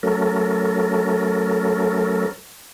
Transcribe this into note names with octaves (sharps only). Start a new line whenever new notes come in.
F#3 A3 C#4 A4 A#4